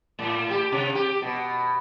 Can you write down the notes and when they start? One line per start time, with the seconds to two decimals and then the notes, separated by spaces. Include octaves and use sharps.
0.19 A2
0.50 G4
0.72 C3
0.95 G4
1.22 B2